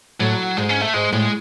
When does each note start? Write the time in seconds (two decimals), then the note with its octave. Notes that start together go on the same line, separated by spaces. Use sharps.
0.20 A2 F#3
0.57 G#2 G#3
0.69 C#4
0.81 A3
0.94 G#2 G#3
1.12 A2 G#3